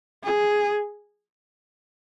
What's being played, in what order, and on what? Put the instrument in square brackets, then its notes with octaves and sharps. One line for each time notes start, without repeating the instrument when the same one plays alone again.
[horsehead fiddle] G#4